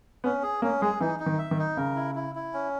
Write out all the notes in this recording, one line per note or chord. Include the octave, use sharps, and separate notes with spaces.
B3 C#4
G#4
A#3 C#4
G#3 G#4
E3 D#4
D#4
D#3
E5
D#3
D#4
C#3 A#4
E4
E4
E4
C#4